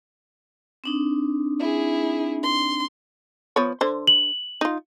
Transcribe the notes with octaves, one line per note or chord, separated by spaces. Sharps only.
C4 D4 D#4
E4 G#4
C6
F3 B3 C#5
D3 C5
F#7
D#4 F4